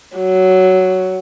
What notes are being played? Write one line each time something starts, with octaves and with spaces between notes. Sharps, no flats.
F#3